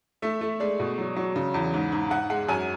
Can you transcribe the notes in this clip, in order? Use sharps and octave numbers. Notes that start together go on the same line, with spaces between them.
A3 E5
A3
G#3 D5
B2
F#3
F#3
C#3
E2
G#2
G#2
G#2 F#5
G#3 F#5
F#2 G#5